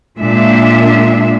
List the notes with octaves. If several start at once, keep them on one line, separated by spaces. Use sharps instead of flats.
A#2 G#3 A#3 D4 E5